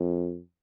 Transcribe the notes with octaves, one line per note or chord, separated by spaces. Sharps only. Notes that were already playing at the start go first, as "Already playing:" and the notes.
Already playing: F2